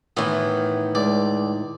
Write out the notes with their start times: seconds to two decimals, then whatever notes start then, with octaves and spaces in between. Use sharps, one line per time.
0.17 A2 D#3 E3 B3
0.95 C#2 D5